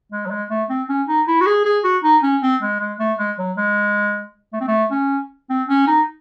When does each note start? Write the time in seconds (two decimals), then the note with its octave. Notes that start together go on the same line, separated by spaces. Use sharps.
0.12 G#3
0.26 F#3
0.31 G#3
0.50 A3
0.70 C4
0.89 C#4
1.08 D#4
1.28 E4
1.41 F#4
1.47 G#4
1.65 G#4
1.84 F#4
2.04 D#4
2.23 C#4
2.43 C4
2.62 G#3
2.80 G#3
3.00 A3
3.19 G#3
3.39 F#3
3.57 G#3
4.53 A3
4.61 C4
4.68 A3
4.91 C#4
5.50 C4
5.69 C#4
5.88 D#4